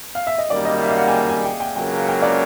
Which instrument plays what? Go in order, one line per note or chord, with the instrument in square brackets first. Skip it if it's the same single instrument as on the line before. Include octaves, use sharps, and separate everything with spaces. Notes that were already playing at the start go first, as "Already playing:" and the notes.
[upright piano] F5
E5
D#5
[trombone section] F#2 D#3 G3 A#3 [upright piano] D5
[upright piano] D#5
E5
F5
F#5
G#5
G5
G#5
G5
G5
[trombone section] C#2 C#3 F#3 A#3 [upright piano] G5
[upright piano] G5
D5